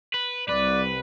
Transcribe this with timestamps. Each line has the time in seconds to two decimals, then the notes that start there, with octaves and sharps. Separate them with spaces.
0.14 B4
0.49 C2 B4 D5